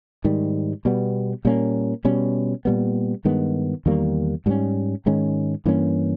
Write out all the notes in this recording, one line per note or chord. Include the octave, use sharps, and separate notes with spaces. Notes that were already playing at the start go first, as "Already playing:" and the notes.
G#2 D#3 G3
B2 G3 B3
A#2 G3 A#3 C#4
B2 G3 C#4
A#2 G3 B3
G2 D#3 G#3 B3
E2 D#3 G3 A#3
G#2 G3 A#3 C#4
G#2 D#3 G#3 C#4
G2 E3 A#3 C#4